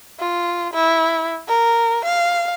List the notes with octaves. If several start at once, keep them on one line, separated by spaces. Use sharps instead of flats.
F4
E4
A#4
F5